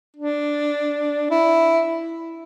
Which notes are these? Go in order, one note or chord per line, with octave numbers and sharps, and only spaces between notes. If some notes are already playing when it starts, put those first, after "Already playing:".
D4
E4